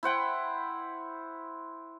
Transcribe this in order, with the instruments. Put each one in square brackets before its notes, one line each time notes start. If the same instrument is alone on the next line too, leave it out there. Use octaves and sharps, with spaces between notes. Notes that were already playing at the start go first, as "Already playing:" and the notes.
[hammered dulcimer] E4 C5 F#5 G5